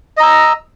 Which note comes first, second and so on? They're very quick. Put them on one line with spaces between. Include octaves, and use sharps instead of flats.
D#5 A#5 E6